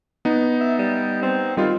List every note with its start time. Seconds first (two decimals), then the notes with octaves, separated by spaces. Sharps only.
0.25 B3 D#4
0.61 E5
0.79 G3
1.22 C4
1.57 D#3 G3 F4